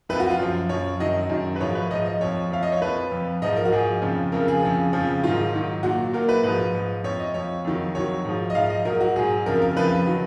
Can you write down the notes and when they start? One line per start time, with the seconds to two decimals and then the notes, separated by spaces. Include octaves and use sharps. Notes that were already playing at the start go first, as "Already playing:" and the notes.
0.09 F2 B4
0.13 F3
0.20 F#4
0.30 F4
0.39 F#2 F3
0.69 F#2 F3 C#5
1.00 F#2 D#3 F#3 D#5
1.30 F#2 D#3 F#3
1.56 B4
1.60 G#2 F3 C#5
1.75 B4
1.90 G#2 F3 D#5
2.06 D#5
2.21 F2 F3 C#5
2.50 F2 F3 F5
2.63 D#5
2.72 C#5
2.82 F2 F3 B4
3.12 F2 F3
3.42 G#2 F3 D#5
3.57 A#4
3.65 F#4
3.72 G#2 F3 G#4
4.02 F2 C#3 F3
4.32 F2 C#3 F3 A#4
4.48 G#4
4.62 F2 C#3 F3
4.93 F2 C#3 F3
5.23 G#2 D#3 F#3 F4
5.53 G#2 D#3 F#3
5.83 A#2 F#3 F#4
6.13 A#2 F#3 A#4
6.29 B4
6.43 G#2 F3 B4
6.74 G#2 F3
7.04 F2 F3 C#5
7.19 D#5
7.34 F2 F3 C#5
7.64 F2 D#3 F#3
7.95 F2 D#3 F#3 C#5
8.25 G#2 F3
8.50 D#5
8.55 G#2 F3 F5
8.70 D#5
8.85 G#2 F#3 A#4
9.00 F#4
9.16 G#2 F#3 G#4
9.46 F2 C#3 F3 A#4
9.62 A#4
9.76 F2 C#3 F3 B4
10.07 D#3 F#3